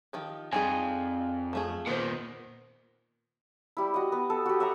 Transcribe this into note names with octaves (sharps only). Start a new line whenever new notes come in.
D#3 F3 G4
F2 G3 D#4 G#4 G#5
F3 A3 G#4
A#2 D#3 B3 C5
G3 E4
F#4 D#5
B3
A4
F#4 G4
E5 F#5 A#5